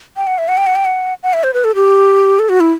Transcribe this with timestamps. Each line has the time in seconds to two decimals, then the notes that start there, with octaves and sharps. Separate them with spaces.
0.17 G5
0.27 F#5
0.38 E5
0.48 F#5
0.58 G5
0.67 F#5
0.76 G5
0.85 F#5
1.23 F#5
1.33 E5
1.44 C5
1.54 B4
1.64 A4
1.75 G4
2.39 A4
2.49 F#4
2.60 E4